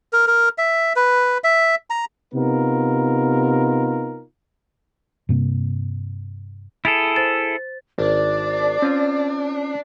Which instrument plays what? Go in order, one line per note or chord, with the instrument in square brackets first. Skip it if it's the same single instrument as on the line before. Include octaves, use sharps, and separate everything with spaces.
[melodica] A#4
A#4
E5
B4
E5
A#5
[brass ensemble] C3 B3 D#4 F4 A#4
[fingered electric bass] G2 C3 A#3
[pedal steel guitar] E4 G#4 A4 [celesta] A6 D7 F7
[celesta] C5 A6
[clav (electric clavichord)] G#1 [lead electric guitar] D4 [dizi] D5
[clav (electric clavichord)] C4 F4 [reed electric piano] C#4